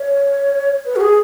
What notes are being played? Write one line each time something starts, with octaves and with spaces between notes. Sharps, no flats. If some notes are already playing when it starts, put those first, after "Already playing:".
Already playing: C#5
B4
F#4
G#4